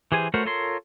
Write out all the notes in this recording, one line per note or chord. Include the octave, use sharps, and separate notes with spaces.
E3 G4 G#4 C5 G#5
A3 F#4 A#4 C5 C#5
F4 A4 A#4 C#5 C6